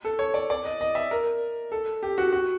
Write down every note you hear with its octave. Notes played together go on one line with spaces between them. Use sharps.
A4
C#5
D5
D5
D#5
D#5
E5
A#4
A4
G4
F#4
F#4